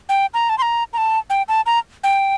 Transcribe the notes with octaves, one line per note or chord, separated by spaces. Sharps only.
G5
A#5
A5
C6
A#5
A#5
A5
G5
A5
A#5
G5